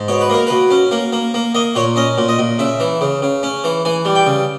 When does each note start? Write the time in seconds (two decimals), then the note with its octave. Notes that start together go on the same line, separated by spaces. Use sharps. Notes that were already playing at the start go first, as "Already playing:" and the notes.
Already playing: G#2
0.08 B2 C#5
0.21 B4
0.30 A#3 A#4
0.47 B2 B4
0.70 C#4
0.91 A#3
1.13 A#3
1.34 A#3
1.55 A#3 D#5
1.75 A#2 C#5
1.96 C#4 D#5
2.18 A#2
2.28 D#5
2.39 A#2
2.59 C#3 E5
2.80 E3
3.01 C#3
3.22 C#3
3.43 C#4
3.64 E3
3.85 E3 G#5
4.05 G3
4.15 G5
4.26 C#3